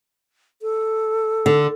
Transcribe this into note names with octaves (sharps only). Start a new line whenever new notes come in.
A4
D3